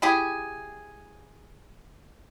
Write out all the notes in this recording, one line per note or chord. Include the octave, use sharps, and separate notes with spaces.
E4 G4 G#4